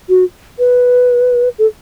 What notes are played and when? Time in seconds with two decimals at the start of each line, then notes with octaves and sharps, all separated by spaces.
0.09 F#4
0.59 B4
1.59 A4